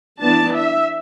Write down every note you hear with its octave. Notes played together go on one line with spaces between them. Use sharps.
E3 B3 D4 A5
E5